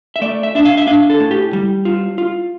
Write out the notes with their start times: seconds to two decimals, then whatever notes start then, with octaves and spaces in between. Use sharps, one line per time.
0.16 E5
0.21 A3 D5
0.43 E5
0.55 D4 E5
0.65 F5
0.77 E5
0.87 D4 F5
1.10 A4
1.20 A2
1.31 G4
1.53 G3
1.85 F4
2.18 F4